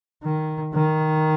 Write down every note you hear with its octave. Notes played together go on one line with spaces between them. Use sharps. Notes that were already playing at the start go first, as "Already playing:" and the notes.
D#3
D#3